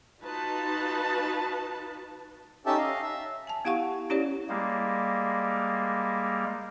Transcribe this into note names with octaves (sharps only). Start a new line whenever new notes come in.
D#4 F4 F#4 B4 A5
C#4 D#4 G4 A4 E5 A5
D#5 F5
E5
G#5 A5
B3 E4 G4 F5 F#5 C#6
C#4 E4 G4 C#5 D5
G3 G#3 A#3